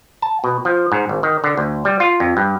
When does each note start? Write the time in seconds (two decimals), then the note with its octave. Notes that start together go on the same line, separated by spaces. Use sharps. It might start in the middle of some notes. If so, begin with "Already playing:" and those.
0.22 A5
0.44 B2
0.65 F3
0.92 G#2
1.09 G#1
1.23 D#3
1.44 D3
1.57 D2
1.85 G3
2.00 F4
2.20 F2
2.37 G2